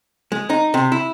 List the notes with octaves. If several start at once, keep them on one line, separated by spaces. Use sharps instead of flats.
G#3
D#4
C3
E4